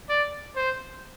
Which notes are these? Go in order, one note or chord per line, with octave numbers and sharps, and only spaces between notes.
D5
C5